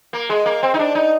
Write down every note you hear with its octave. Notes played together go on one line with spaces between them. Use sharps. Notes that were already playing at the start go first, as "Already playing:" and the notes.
A#3
G#3
A#3
C4
D#4
D4
D#4